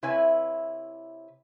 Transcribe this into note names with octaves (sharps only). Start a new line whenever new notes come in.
C3 E4 B4 C#5 E5 G#5